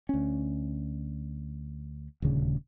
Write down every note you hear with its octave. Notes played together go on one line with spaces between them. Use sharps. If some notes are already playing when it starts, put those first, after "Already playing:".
D2 C#4
D#1 D2 C#3